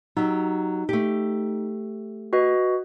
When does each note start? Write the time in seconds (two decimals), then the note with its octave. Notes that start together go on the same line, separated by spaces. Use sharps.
0.17 F#3 D#4 G4
0.89 A3 G4
2.33 F#4 B4 D#5